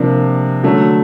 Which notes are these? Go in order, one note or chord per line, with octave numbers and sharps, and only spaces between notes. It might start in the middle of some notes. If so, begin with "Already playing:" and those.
Already playing: C3 F3 A#3 D4
D3 F#3 A3 D4